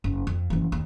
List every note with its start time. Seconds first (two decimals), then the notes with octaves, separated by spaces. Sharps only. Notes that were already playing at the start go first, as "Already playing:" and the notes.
0.04 F#1
0.27 F2
0.50 F#1 E3
0.72 D#2